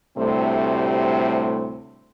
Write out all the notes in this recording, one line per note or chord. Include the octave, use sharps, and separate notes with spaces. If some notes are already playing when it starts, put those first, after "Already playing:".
D2 A2 C3 G3 A3 C4